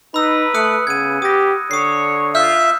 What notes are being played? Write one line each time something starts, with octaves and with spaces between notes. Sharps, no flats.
D#4 B4 B5 E6
A3 D#6 F#6 C#7
C#3 B3 G#6 D#7
G4 D#6 A#6
D3 C#5 D#6 C7
F4 E5 F6 G6